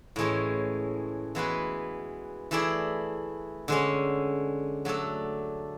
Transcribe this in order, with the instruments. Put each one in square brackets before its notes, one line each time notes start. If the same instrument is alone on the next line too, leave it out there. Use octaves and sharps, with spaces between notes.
[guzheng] A2 E3 G#3 C#4 G#4
E3 G#3 B3 F#4 B4
E3 A3 E4 G#4 D5
D3 G#3 C#4
F#3 A3 D4 A4